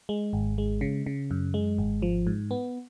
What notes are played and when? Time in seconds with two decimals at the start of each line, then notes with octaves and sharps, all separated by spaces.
0.09 G#3
0.33 G#1
0.58 G#3
0.81 C#3
1.06 C#3
1.31 F#2
1.54 G#3
1.78 G#1
2.02 F3
2.27 G#2
2.51 B3